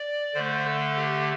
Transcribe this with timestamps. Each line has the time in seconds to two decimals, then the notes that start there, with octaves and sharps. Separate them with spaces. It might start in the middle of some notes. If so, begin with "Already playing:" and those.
Already playing: D5
0.34 D3 A3 C5
0.65 A4
0.96 G4